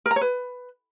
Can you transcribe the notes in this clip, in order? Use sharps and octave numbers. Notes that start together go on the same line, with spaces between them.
A#4
A#5
C#5
B4